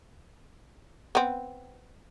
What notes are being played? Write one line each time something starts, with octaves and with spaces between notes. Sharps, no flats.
B3 C4